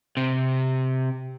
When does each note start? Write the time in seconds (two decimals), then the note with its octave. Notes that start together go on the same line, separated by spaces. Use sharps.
0.17 C3